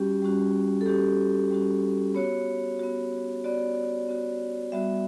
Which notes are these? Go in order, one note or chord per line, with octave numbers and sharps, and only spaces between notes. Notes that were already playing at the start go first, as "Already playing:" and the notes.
Already playing: G3 C#4 F#4 G4
G3 C#4 F#4
A4
G3 C#4 F#4 G4
G3 C#4 F#4
B3 F#4 C#5
B3 F#4
B3 F#4 D5
B3 F#4
G3 B3 F#4 E5